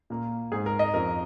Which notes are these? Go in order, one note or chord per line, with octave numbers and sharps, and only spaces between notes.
A#2 A#3
G#2 G#3 C4 G#4
A#4
D#5
F2 F3 C4 A#4